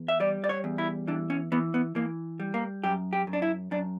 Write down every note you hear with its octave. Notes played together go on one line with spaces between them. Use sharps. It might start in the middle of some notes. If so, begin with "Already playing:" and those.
Already playing: E2
E5
G3 D5
D5
C#5
E2
E4
E3 D4
C#4
E3 B3
B3
E3 A#3
G3
A#3
F#2 G4
G4
F#2
D4
E4
F#2 D4